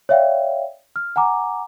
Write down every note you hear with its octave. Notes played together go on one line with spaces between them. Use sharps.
C#5 D5 E5 F5 G5
F6
F#5 G#5 A#5 D6